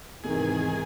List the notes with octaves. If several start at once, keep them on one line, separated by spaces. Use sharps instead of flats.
E2 G#2 C3 D#3 E3 G#4